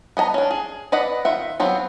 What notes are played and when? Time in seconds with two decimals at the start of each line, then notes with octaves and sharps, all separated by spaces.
0.17 B3 D#5 G#5 A#5
0.34 C#4 D4
0.51 G#4
0.92 B4 D5 D#5 F#5 B5
1.25 D#3 F4 E5 F#5
1.60 F#3 B3 C4 F4